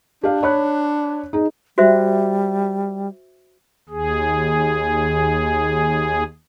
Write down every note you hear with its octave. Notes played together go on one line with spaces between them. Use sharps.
D4 G4 F5
C#5 B5 F#6
D#4 G#4
G3 F#4 C5 E5
D#2 G#4